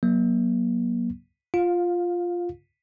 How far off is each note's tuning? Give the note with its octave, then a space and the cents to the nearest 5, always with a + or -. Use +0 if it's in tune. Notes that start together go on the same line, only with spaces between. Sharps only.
F#3 +0 A#3 +35
F4 +0 F5 +25